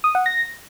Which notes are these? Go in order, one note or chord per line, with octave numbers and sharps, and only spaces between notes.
D#6
F#5
A#6